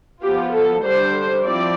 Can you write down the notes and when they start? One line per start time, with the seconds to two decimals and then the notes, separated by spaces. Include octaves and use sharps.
0.23 F3 B3 F4 G4
0.53 A4
0.83 D3 G3 D4 C5
1.43 F3 C4 E4 D5